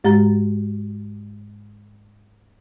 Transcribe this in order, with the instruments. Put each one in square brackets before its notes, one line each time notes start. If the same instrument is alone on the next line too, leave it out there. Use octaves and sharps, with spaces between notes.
[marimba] G#2 G#3 G4 A#5 A6